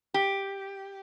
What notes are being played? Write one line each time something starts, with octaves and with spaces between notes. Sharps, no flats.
G4